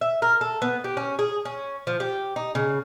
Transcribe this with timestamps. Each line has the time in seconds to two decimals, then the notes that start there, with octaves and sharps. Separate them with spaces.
0.01 E5
0.22 A#4
0.41 A4
0.62 B3
0.84 G4
0.97 C#4
1.19 G#4
1.45 C#4
1.87 F3
2.00 G4
2.36 D#4
2.55 C#3